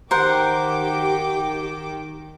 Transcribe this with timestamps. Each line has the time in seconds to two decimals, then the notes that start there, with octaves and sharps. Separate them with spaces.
0.11 D#3 G4 A#4 C5 F#5 G5 D6